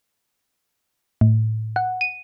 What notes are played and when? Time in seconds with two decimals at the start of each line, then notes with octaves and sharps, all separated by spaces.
1.21 A2
1.76 F#5
2.01 D#7